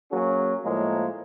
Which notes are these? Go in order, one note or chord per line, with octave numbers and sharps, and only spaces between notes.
F#3 A#3 C#4 F#4 G#4
A2 F3 G#3 A#3